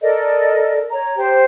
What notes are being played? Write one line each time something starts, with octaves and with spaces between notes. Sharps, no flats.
A4 A#4 D5 D#5
C#5 A#5
G4 C5